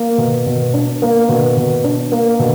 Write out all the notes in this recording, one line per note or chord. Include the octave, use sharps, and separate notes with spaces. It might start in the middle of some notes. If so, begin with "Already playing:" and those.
Already playing: A#3
B2
B2
D4
A#3
B2
B2
D4
A#3
B2